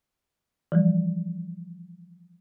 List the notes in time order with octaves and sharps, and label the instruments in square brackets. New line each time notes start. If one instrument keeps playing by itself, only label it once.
[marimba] E3 F3 G3